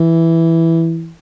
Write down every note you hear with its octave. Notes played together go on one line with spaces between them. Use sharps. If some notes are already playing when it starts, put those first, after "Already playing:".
Already playing: E3